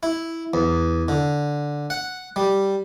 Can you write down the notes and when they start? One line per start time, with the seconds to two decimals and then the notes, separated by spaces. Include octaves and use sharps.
0.03 E4
0.54 E2
1.08 D3
1.90 F#5
2.36 G3